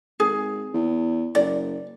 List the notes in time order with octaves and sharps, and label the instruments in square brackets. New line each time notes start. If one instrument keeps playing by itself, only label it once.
[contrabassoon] G#1 [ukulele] G#4
[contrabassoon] E2
[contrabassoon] F#1 [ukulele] D5